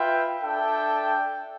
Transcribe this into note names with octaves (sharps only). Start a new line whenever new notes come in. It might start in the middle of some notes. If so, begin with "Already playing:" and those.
Already playing: F4 B4 E5 G5
D4 A4 E5 G5